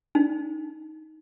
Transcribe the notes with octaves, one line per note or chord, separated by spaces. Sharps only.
D#4